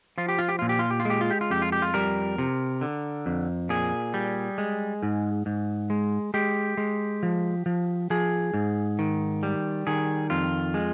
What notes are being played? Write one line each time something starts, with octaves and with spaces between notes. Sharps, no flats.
F3 F4
G4
F4
G4
A#2 F4
G4
F4
G4
F4
G#3 G4
F4
G4
F4
F2 G4
F4
G4
F4
G3 A#4
C3
D3
F2
A#2 G#4
G3
G#3
G#2
G#2
G#3
G#3 G4
G#3
F3
F3
F3 G#4
G#2
D#3
G3
D#3 G#4
F2 F4
G#3